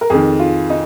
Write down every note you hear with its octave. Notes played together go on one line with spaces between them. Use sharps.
A#4
F2 D#3 G#4
F4
D#4